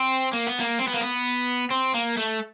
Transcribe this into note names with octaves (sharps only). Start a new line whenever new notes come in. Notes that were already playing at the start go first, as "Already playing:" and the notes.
Already playing: C4
A#3
B3
A#3
C4
B3
A#3
B3
C4
A#3
A3